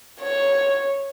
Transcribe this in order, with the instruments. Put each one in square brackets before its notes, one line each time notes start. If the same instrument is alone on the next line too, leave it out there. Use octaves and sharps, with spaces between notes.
[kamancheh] C#5